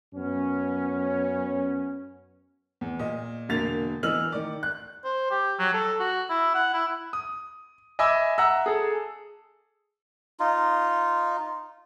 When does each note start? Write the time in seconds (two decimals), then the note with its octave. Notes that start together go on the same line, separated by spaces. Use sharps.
0.14 F#2 B3 C#4
2.81 E2
2.99 A#2 D#5
3.49 E1 D3 A#3 A6 F7
4.03 E3 B3 D#5 E6 F6 F#7
4.32 D#3 D5
4.63 F#6
5.04 C5
5.30 G4
5.59 F#3
5.74 A4
5.99 F#4
6.29 E4
6.54 F#5
6.73 E4
7.13 D#6
7.99 D#5 E5 G#5 B5 D6 E6
8.38 E5 F#5 A#5 E6
8.66 G#4 A4
10.40 D#4 F4